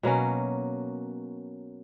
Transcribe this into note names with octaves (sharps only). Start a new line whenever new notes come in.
B2 F#3 A#3 C#4